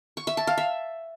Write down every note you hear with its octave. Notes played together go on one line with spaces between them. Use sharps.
C#6
E5
A5
F5
E5